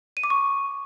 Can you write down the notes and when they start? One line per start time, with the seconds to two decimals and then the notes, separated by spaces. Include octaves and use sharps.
0.17 D#7
0.23 D6
0.30 C#6